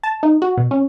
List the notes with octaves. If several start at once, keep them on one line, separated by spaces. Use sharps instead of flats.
A5
D#4
F#4
B2
C#4